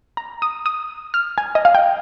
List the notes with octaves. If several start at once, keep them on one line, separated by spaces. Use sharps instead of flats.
A#5
D#6
D#6
F6
G#5
D#5
F5
G5